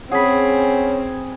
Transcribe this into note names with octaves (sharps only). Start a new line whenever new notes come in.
C4 C#4 G#4 F#5 B5 B6